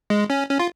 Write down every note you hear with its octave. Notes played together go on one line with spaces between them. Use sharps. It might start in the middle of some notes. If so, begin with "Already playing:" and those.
G#3
C#4
C#4
F4